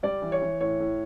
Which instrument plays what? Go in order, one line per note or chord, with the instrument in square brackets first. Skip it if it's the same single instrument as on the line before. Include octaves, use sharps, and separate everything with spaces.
[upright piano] G3 D5
E3
C#5
E3
A2 C#5
A2